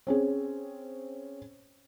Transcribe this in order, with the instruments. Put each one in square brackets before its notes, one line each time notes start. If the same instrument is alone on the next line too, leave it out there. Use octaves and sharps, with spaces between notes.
[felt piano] C4 C#4 G#4